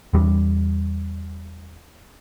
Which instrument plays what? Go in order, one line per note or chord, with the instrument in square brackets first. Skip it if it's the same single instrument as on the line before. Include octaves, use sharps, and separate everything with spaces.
[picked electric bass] E2 G3